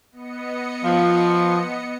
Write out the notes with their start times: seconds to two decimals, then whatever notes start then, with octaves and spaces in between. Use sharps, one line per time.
0.12 B3 D#5 C#7
0.84 F3